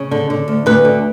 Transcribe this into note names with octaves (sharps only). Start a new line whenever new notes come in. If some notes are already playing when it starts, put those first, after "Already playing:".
Already playing: C#3
D3
D3
D2
D2 B4
D3